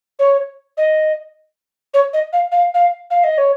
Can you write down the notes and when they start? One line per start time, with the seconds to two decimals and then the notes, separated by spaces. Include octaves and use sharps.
0.19 C#5
0.77 D#5
1.94 C#5
2.13 D#5
2.33 F5
2.52 F5
2.74 F5
3.11 F5
3.24 D#5
3.38 C#5